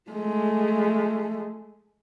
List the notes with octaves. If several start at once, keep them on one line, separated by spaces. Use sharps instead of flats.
G#3 A3